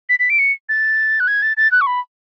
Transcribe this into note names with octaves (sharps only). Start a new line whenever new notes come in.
B6
B6
D7
C#7
A6
F#6
G#6
A6
A6
F#6
C#6
B5